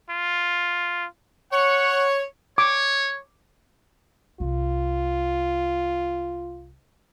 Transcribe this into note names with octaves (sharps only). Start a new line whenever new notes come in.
F4
C#5 F#5
C#5 D6
C2 F4